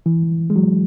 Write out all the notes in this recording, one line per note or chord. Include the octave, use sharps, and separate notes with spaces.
E3
G#3
F#3